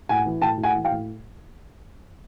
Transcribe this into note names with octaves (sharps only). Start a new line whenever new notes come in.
A2 F#5 G#5
E3
A2 G5 A5
A2
F#5 G#5
E3
F5 G5
A2